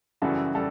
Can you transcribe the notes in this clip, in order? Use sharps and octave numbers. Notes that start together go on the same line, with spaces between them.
F#2 C#3 E3 G3 F#4 A4
G3 A4